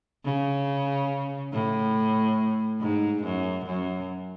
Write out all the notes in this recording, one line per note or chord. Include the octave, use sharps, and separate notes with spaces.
C#3
A2
G#2
F#2
F#2